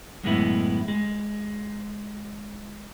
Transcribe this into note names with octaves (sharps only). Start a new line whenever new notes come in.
F#2 A2 D3 G#3 B3 E4
G#3